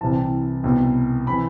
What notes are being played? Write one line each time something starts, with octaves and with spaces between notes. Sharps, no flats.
C2 C3 E3 A5
C2 B2
C3 E3 B5